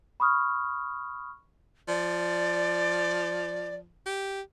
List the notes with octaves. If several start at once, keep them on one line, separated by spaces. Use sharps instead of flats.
B5 C#6 D#6 F6
F3 D5
G4